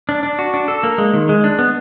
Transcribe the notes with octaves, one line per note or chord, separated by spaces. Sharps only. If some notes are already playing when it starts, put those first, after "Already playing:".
D4
D4
F#4
D4
A4
A#3
G#3
D#3
G#3
D4
B3